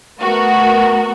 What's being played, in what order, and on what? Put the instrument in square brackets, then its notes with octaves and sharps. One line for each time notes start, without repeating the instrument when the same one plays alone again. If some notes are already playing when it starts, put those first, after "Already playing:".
[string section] A3 B3 F#4 A#4